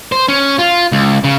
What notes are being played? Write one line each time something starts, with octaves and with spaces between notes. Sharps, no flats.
C5
C#4
F4
C#2
C#3